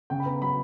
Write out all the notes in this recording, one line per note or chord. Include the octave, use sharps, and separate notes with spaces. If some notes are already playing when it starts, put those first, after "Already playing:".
C#3 G5
B5
B3 A#5
F#3 B5